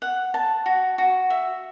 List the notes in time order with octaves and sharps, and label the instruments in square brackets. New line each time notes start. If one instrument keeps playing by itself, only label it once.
[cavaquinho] F#5
A5
F#4
F#4
E5